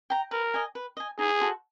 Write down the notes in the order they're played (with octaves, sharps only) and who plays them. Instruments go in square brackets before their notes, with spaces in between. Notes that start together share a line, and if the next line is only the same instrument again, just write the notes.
[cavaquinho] G5 A#5
[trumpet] A#4 [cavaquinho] B4
[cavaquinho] D#5 G#5
B4
D#5 G#5
[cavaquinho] D#4 [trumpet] G#4
[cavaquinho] F#4 A4 C5